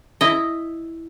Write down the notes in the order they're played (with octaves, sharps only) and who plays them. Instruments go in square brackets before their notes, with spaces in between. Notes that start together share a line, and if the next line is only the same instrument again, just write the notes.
[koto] E4 D#5